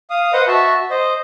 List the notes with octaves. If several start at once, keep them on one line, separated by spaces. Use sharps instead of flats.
F5 D#6
B4 C5 D#5 F#5 D#6
F#4 E5 A5
C5 D#5